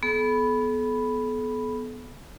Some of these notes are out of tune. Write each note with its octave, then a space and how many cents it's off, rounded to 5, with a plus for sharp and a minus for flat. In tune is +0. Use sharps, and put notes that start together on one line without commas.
B3 +0 A4 -40 B5 +0